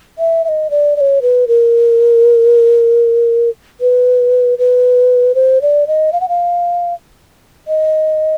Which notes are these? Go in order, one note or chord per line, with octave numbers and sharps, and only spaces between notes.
E5
E5
D#5
D5
D5
C#5
B4
A#4
B4
B4
C5
D5
D#5
F5
F#5
F5
D#5